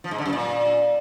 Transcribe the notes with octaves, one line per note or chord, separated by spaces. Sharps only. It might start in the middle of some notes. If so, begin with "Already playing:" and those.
F3
G#2
D3
F#2
A#2